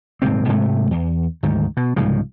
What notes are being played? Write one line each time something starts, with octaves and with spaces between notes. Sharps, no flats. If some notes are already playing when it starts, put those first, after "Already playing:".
D#1 G#2 C3 C4
G#2 C3 G#3 A3
E2
D2 G#2 D#3
B2
C2 G#2 C#3 F3